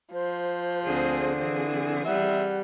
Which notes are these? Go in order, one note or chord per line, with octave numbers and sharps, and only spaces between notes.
F3 C5
D2 D3 C4 G#4
E3 C4 G#4
G3 E5 F#5